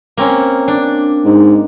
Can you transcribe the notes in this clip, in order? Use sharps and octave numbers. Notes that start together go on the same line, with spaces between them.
A#3 C4 C#4
D4
G#2